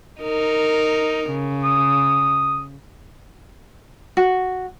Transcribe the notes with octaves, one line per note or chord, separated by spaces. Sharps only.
D#4 A#4
C#3
D#6
F#4